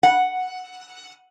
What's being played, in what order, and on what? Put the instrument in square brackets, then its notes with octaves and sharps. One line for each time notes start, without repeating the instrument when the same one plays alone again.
[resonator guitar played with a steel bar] F#5